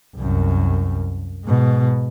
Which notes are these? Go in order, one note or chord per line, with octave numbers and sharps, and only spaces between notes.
C2 F#2
G#2 B2